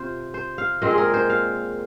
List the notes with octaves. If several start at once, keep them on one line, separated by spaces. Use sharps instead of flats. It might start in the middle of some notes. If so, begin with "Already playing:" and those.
Already playing: C3 C4 F4 C5
C5
F5
A#2 G#3 C4 D#5
G#4
A#4
C5
F5